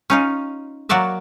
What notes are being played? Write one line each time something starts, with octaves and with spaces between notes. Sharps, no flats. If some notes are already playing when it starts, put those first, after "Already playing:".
C#4 D#4 F4
F#3 A#3 F#4 D5 E5